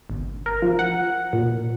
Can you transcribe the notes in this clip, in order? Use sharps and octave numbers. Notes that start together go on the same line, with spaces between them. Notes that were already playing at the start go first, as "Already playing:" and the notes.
G1
A#4
F3
F#5
A#2